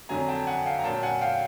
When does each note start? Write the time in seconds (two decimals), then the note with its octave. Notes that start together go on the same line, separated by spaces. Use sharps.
0.09 F2 D3 F#3 G#5 A#5
0.28 G5 A5
0.47 F#5 G#5
0.66 F5 G5
0.79 A#5
0.84 A#2 F#3 G5 A5
1.03 F#5 G#5
1.21 F5 G5